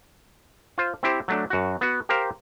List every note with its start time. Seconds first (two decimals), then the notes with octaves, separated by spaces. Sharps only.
0.78 F4 C5
1.03 C4 E4 G4 C5
1.28 F#3 A3 D4
1.50 F#2 F#4
1.81 B3 F#4
2.09 G4 A#4 C5 F5